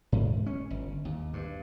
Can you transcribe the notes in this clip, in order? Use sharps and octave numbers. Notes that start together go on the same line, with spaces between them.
G#2
C#4
G1
D#2
G2